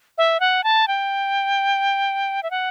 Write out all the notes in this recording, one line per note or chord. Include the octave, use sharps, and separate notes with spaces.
E5
F#5
A5
G5
E5
F#5